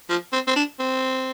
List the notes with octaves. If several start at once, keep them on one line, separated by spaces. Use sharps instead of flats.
F3
C4
C4
D4
C4